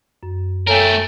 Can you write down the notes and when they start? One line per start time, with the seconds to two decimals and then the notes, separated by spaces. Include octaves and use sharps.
0.23 F#2
0.67 A3 A4 A#4 C#5 G5 G#5